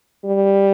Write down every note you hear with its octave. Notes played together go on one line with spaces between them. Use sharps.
G3